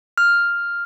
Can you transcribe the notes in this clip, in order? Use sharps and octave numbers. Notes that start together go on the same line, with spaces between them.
F6